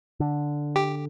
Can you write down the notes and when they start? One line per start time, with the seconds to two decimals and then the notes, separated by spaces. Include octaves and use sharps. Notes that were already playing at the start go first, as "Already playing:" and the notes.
0.20 D3
0.76 G4